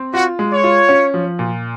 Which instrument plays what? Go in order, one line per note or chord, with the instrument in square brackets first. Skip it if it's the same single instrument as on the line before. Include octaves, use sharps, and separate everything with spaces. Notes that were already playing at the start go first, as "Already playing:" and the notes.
Already playing: [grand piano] C4
[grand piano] F4 [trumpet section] F#4
[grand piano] G#3
[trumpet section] C#5
[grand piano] F4
C#4
F3
A#2